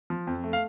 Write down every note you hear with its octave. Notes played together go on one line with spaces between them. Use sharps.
F3
F2
A3
F5